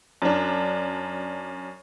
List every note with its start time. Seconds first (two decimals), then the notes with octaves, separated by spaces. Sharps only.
0.22 F#2 D4